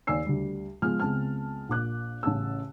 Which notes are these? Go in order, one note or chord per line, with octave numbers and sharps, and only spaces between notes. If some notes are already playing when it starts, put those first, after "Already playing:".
D#2 D5 G#5 E6 C7
D2 G3
F3 G#3 B3 G#5 F6
C#2 G#3 B3 C4 A5 F6
A#1 A#2 D6 F#6
A1 C#3 A5 E6